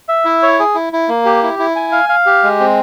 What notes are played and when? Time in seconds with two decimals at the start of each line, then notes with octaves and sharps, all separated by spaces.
0.09 E5
0.25 E4
0.43 C#5
0.60 G#4
0.75 E4
0.93 E4
1.08 A#3
1.25 G4
1.43 E4
1.59 E4
1.76 G#5
1.92 F5
2.09 F5
2.26 G4
2.43 G#3
2.60 C4